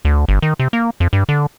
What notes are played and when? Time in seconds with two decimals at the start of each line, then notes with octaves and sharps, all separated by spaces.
0.05 D2
0.28 G1
0.42 D#3
0.59 C3
0.73 A#3
1.00 F2
1.13 G2
1.29 D3